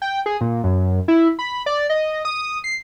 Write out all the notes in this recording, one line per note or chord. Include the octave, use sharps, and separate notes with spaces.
G5
G#4
A#2
F#2
E4
B5
D5
D#5
D#6
C7